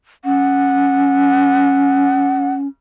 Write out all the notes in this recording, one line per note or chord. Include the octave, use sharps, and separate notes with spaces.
C#4 F#5